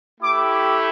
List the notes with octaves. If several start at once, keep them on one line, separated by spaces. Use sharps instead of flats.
A3 E4 G4 D6